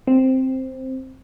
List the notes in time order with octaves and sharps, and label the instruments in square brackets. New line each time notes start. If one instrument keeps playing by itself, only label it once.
[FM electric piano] C4